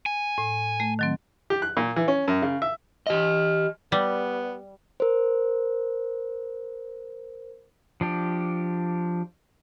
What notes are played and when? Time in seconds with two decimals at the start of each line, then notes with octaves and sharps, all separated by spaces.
0.06 G#5
0.38 A2
0.80 A3
0.99 D#3 F#3 C4
1.50 G4
1.62 F#6
1.77 A#2
1.96 E3
2.08 C#4
2.28 F#2
2.42 C#3
2.62 E5
3.07 G4 D#5
3.92 G3 B3
5.00 A#4 C5
8.01 F3 D4 G4